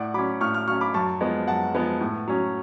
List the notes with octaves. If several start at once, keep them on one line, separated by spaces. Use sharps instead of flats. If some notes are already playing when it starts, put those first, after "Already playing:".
Already playing: A2 D5 F#5
F#3 C#4 B5 D6
A2 C#6 F6
C#6 F6
F#3 C#4 C#6 F6
B5 D6
F#2 A5 C#6
F3 G#3 B3
F#2 F#5 A5
F3 G#3 B3
A2
F#3 C#4